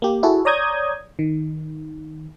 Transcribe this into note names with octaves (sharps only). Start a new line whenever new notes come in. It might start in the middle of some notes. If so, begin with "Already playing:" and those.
A#3 G4
E4 F#4 G#4 A4
C#5 D5 A#5 D#6 G6 G#6
D#3